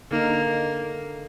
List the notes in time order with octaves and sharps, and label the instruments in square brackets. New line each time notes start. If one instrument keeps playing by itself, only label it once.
[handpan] D3 D#4 [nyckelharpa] A#3